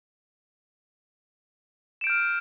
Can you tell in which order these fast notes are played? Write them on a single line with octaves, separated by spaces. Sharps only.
E7 D7 G6 F6